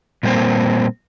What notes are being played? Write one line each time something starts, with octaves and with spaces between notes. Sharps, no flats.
A#2 G3 A#3 C4